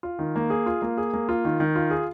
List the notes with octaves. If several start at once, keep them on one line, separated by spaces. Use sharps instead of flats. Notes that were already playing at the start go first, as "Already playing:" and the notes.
F4
D#3
A#3
G#4
F4
A#3
G#4
A#3
F4
D#3
D#3
F4
G#4